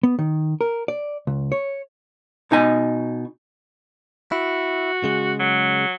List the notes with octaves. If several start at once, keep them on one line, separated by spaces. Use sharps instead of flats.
B3
D#3
A#4
D5
C#2
C#5
B2 D#4 D#5 G#5
E4 F#4
C#3 G#3
F#3